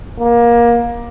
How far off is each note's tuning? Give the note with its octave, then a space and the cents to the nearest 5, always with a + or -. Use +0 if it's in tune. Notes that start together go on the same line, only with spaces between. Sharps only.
A#3 +20